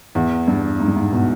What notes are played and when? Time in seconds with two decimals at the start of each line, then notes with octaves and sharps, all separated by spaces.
0.15 E2
0.48 G2
0.80 G#2
0.88 G2
0.96 G#2
1.12 B2